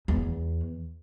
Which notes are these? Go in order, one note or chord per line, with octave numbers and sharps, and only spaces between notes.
E2